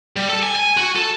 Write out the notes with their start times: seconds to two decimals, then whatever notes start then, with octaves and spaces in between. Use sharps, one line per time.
0.16 G3
0.29 A4
0.43 G#5
0.56 G#5
0.78 F#4
0.96 A4